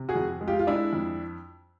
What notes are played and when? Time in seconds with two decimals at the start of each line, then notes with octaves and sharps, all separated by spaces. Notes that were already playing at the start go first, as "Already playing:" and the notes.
Already playing: C3
0.09 F#4 G#4
0.15 F2
0.41 G#3
0.47 F4 G4
0.59 F4
0.67 G#3 D4 E4
0.93 F2